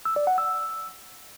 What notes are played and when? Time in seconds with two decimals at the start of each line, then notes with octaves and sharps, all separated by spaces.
0.05 E6
0.16 D5
0.27 F#5
0.38 E6